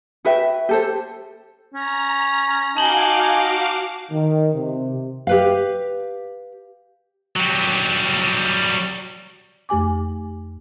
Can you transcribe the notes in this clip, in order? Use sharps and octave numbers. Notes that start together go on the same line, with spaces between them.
F#4 B4 E5 G5
G4 A4 C5
C#4 A#5
D#4 F#4 F5 G#5 A5 D6 F#7 G7
D#3
C3
G4 B4 F5
F#3 G3
F2 A3 G4 G#5 D6